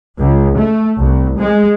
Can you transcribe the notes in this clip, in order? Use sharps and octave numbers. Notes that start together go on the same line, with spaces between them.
C#2
A3
C2
G#3